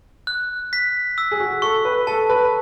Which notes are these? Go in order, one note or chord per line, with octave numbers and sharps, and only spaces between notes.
F#6
B6
E6
G#4
F#4
A4 C#6
B4
A4 A5
B4